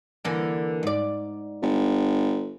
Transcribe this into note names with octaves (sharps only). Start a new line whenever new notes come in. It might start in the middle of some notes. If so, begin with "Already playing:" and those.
D3 E3 A#3
G#2 D5
G1